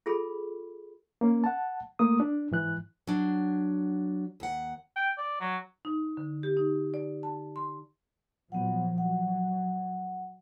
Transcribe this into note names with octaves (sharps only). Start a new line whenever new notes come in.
F4 G#4 A4 B5
A#3 C#4
F#5 A5
A3 A#3 D#6
D4
G#2 E3 F#6
F#3 D4
D#2 F#5
G5
D5
F#3
D#4
D3
G4
D#4
D5
A5
C6
A#2 F3 F#3 B3 F#5
F#3 F#5